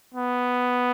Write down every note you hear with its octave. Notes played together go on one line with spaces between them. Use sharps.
B3